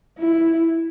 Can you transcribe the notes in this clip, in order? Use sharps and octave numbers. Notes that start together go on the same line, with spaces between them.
E4